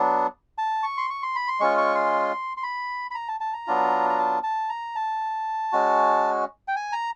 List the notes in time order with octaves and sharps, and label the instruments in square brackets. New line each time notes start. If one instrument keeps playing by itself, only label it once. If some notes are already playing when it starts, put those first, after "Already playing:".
Already playing: [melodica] F#3 B3 D4
A5
C#6
C6
C#6
C6
B5
C6
G#3 C#4 F4 C#6
C#6
C6
C6
B5
B5
A#5
A5
A5
A#5
F#3 B3 D4 F4
A#5
A5
A5
A#5
A5
G#3 C#4 F#4
G5
G#5
A#5